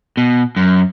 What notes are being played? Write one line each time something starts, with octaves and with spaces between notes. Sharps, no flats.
B2
F#2